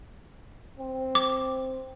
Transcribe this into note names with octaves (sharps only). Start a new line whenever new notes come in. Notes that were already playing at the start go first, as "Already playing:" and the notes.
C4
D6